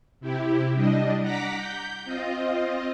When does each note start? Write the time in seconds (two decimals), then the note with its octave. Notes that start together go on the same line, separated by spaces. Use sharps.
0.20 C3 E4 G4
0.75 G3 D4 D#5
1.21 F#5 A#5 D6 B6
1.57 G6
2.05 C4 F4 D#5